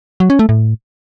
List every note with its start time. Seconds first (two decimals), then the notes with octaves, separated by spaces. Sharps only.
0.20 F#3
0.30 C#4
0.39 A3
0.49 A2